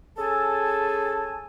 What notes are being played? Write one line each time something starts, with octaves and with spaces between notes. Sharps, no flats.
C#4 G#4 A4 G#5 A5